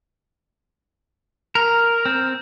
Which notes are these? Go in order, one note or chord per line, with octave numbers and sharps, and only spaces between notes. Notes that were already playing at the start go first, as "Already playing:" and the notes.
A#4
C4